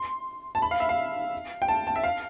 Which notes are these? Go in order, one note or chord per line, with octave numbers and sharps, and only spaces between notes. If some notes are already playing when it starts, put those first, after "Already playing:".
Already playing: C6
A5
B5
F5
E5
F5
G5
A5
A5
E5
F5